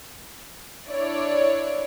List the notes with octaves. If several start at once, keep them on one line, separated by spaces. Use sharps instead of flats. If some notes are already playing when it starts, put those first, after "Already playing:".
D4 E4 C#5 D5